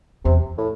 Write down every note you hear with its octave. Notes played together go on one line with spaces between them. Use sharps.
E2 C3
A2